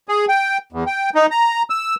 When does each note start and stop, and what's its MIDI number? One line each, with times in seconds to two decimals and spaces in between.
0.08 0.25 68
0.29 0.58 79
0.73 0.84 40
0.87 1.10 79
1.15 1.26 63
1.31 1.62 82
1.70 1.95 88